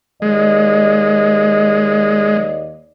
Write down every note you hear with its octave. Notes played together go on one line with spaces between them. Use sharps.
D#2 G#3 D5 D#5